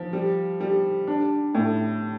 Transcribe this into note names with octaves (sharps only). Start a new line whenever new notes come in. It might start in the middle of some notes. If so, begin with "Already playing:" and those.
Already playing: F3
G3
G3
D4
A2